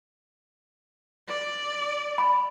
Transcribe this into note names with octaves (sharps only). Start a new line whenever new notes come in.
D5
B5